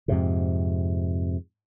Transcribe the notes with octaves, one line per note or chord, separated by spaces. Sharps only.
F2 G#2 C3